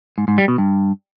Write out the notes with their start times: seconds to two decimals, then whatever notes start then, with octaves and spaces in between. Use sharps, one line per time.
0.18 G#2
0.28 G#2
0.38 G3
0.48 B2
0.58 G2